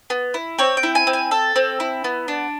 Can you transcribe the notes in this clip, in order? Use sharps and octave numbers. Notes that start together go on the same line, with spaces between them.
B3
E4
C4 C#5
G5
E4
G#5
C4
G#5
A4 A5
C4
E4
B3
D4